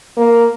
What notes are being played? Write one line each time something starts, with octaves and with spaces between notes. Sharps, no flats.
A#3